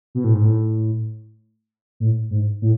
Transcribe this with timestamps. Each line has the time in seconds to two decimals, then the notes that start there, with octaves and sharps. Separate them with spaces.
0.15 B2
0.24 A2
0.34 G#2
0.44 A2
2.00 A2
2.31 G#2
2.62 A2